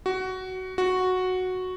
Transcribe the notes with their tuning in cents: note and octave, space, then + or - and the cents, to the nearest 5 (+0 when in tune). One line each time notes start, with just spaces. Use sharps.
F#4 +15
F#4 -5